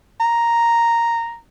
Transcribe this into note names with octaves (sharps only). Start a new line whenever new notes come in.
A#5